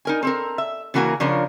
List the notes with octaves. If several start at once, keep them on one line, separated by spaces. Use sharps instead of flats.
D#4 A#4 G#5
C4 A4 A#4
E5
C#3 E3 A#3 F#4 A#4 G#5
C#3 F3 D4 F4 A#4 C#5